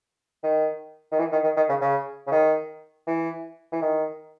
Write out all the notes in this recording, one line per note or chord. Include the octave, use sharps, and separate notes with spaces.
D#3
D#3
E3
D#3
D#3
D#3
C#3
C#3
C#3
D#3
E3
E3
D#3